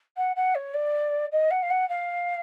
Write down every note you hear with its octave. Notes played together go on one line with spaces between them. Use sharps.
F#5
F#5
C#5
D5
D#5
F#5
F5
F#5
F5